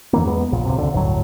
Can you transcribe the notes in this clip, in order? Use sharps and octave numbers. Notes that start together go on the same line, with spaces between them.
F2 E3 A#3
E2 G#3 B3
A#1 A#2
C#2 F#2 C3
C2 D3
G1 D2 A2 F#3